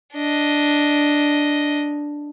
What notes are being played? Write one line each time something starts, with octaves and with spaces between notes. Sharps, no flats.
D4 D#5